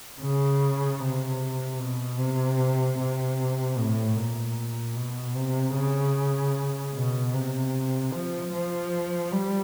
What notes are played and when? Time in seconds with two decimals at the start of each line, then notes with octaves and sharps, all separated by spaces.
0.21 C#3
1.00 C3
1.79 B2
2.19 C3
2.99 C3
3.77 A2
4.17 A#2
4.96 B2
5.35 C3
5.75 C#3
6.94 B2
7.33 C3
8.12 F3
8.52 F3
9.32 G3